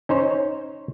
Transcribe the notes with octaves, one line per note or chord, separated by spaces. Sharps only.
C#4 D#4 C5 C#5